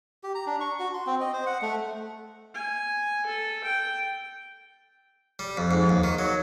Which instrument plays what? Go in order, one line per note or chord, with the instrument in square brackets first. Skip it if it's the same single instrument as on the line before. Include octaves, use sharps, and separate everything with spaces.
[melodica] G4
A#5
D4
C#6
F#4
C6
C4
D#5
C5
F#5
A3
[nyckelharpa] G#5
A4
G5
[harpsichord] G3
F2
G#2
D#2
D#3
F#3